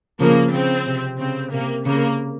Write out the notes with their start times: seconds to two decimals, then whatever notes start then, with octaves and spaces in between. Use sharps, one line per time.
0.19 C#3 F3 A#3
0.53 C#3 C4
0.87 C3
1.19 C#3 C4
1.52 C3 A#3
1.86 C#3 A#3